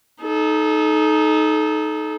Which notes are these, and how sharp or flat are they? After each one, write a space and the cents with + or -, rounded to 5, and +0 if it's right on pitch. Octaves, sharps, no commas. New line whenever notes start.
D#4 +0 A4 -30